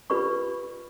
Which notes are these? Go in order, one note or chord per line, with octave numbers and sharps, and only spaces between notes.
F4 G4 B4 D5 B5 C#6